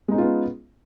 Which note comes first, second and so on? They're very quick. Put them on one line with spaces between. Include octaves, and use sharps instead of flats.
G#3 D#4 C#4 F4 B3